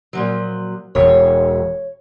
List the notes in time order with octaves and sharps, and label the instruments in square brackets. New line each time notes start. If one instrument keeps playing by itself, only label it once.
[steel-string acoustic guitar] A#2 F3 F#3
[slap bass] E1 [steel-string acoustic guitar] C#5